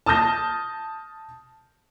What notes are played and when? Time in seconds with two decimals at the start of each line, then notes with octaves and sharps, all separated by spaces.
0.06 A5 D#6 F6 G6 A#6